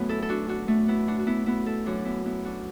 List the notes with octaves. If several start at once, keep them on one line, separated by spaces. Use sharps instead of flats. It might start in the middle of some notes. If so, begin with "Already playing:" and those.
Already playing: F#2 F#3 A3 B3
E4 A4
A4
D4 F#4
D4 F#4
A3 D4
B3 E4
D4 F#4
F#4
B3 E4
B3 E4
E4 A4
F#2 F#3 D4 F#4
B3 E4
B3 E4
D4 F#4